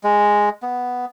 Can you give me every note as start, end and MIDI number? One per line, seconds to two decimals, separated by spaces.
0.04 0.49 56
0.63 1.05 59